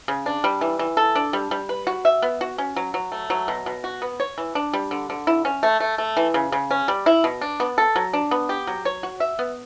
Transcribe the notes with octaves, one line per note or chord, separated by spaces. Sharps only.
C#3
D4
G3
E3
E3
A4
D4
G3
G3
B4
F#4
E5
B3
F#4
C#4
F#3
F#3
A3
F#3
B2
B2
F#4
B3
C#5
E3
D4
G3
D3
D3
E4
C#4
A3
A3
A3
E3
C#3
C#3
C#4
G3
E4
B2
D4
B3
A4
F#3
D4
B3
G4
F#3
C#5
F#4
E5
B3